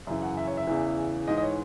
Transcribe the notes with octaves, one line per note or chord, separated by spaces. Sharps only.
F#2 C#3 E3 E5
F#5
E5
C#5
E5
E2 C#3 E3
G#2 E3 D#5
D#5
C#5